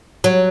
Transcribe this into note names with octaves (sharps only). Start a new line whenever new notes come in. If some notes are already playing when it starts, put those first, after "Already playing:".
F#3